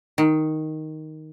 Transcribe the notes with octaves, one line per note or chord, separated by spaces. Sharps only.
D#3